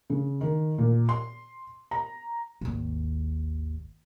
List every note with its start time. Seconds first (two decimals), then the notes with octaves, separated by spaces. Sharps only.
0.10 C#3
0.41 D#3
0.78 A#2
1.09 C6
1.91 A#5
2.61 G#1 D#2